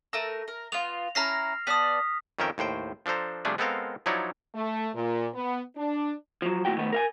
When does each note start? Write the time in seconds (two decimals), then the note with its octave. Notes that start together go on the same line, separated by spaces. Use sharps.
0.13 A3 A#4 E6 A#6
0.48 A#4
0.72 B3 F4 F7
1.15 C#4 E4 A#5 F6 A#6 C7
1.67 B3 D5 A5 D#6 B6
2.39 F2 D#3 C#4 A#4 E5 G5
2.58 D#2 A2 C5 G5
3.06 F3 D4 A4 C5 A#5
3.45 C3 F3 G3 A3 D4 G#4
3.58 G#3 B3 C4 A4 A#4 F5
4.06 F3 F#3 D#4 E4 C#5 D5
4.55 A3
4.95 A#2
5.34 B3
5.77 D4
6.42 F3 F#3
6.65 D#2 A2 F#4 G5
6.77 D#3 A3 B3
6.92 A#4 F5 G#5